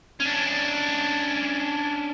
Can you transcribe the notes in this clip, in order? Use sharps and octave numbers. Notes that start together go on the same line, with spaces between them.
C#4 D4